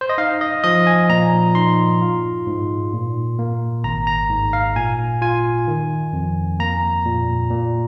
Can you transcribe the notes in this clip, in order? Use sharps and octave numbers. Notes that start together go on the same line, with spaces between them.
C5
D#5
D#4 F5
D#5
F3 D#5
G#5
A#2 A#5
D#4 C6
F4
G#2
A#2
A#3
G#1 A#5
A#5
G#2
F5
A#2 G#5
F4 G#5
D#3
F2
A#3 A#5
A#2
A#2